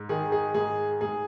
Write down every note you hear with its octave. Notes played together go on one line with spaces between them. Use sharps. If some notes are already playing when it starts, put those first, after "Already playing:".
Already playing: G#2
D#3 G#4
G#4
G#2 G#4
G#2 G#4